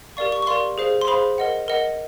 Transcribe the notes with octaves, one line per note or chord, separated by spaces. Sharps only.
G4 A#4 D5 F5 C#6
C#6
C#6
G4 A#4 D5 F5 C6
G#4 C5 F5
C6
G#4 C5 F5 B5
A#4 D#5 F#5
A#4 D#5 F#5